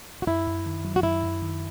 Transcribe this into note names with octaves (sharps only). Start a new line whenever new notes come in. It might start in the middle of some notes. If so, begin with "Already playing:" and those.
F#4
F#2 E4
F#2
D#3
F#3
F#4
F#2 E4
F#2
D#3